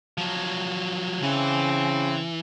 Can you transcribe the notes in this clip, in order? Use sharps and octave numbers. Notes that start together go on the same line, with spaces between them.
F3 F#3
C#3 E3 C4